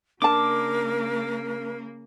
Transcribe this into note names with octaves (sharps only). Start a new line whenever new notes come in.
C#3 A#3 D4 A#4 A5 D6